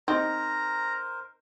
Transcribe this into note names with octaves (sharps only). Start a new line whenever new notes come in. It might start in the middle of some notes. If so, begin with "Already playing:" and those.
C4 D#4 A#4 C5 A#5